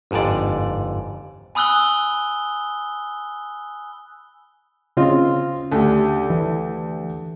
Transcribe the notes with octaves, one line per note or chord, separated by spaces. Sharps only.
G1 F2 G#2 D3 D5
G#5 B5 D#6 E6 F#6 G7
C#3 C4 F4 D#5
D2 G4
E3